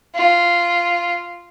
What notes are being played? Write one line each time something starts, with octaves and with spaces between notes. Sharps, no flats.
F4